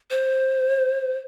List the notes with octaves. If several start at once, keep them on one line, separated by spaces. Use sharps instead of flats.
C5